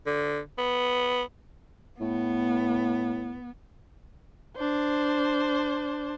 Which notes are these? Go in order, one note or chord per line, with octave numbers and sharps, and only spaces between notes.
D3
B3
A2 B3
D4 C5